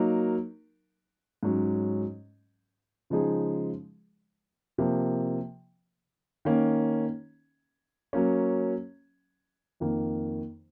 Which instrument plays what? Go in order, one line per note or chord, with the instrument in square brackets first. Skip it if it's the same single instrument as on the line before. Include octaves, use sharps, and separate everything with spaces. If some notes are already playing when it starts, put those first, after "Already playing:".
Already playing: [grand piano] F#3 A#3 D#4 A#4
G#2 F#3 C#4
C#3 F3 G#3 D#4 G#4
C3 F3 A#3
D#3 A#3 C#4
F#3 A#3 C#4
F2 D#3 A#3